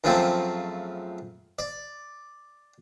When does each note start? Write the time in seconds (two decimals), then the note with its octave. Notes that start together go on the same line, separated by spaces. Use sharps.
0.04 F#2 C#3 F3 A3 C4
1.59 D5